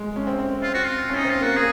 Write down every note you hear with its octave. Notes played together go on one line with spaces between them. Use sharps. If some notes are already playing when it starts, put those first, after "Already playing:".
Already playing: G#3
C#4
C4
C4
C4 F4
F#4
F4
C#4
D#4
C4
F4
A#3 F#4
A#3 G#4